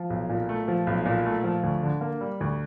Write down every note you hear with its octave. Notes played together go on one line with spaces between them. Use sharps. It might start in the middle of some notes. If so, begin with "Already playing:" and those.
Already playing: F3
B1
A#2
A3
F3
B1
A#2
A3
F3
D2
D3
A#3
G3
D2